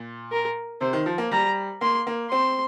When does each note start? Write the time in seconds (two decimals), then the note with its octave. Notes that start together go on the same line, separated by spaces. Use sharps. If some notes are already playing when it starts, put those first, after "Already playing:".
Already playing: A#2
0.32 A#4
0.81 C3 C5
0.93 D#3
1.06 F3
1.18 A#3
1.31 G3 A#5
1.81 A#3 C6
2.07 A#3
2.31 C4 C6